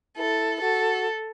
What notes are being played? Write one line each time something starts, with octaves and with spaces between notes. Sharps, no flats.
E4 A4
F#4 A4